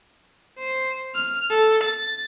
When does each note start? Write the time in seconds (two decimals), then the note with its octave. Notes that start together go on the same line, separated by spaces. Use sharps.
0.59 C5
1.15 F6
1.50 A4
1.83 A6